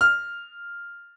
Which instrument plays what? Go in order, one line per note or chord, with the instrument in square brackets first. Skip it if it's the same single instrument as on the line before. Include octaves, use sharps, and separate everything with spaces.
[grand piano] F6